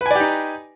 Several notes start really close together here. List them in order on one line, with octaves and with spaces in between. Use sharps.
B4 G#5 D5 G4 D#4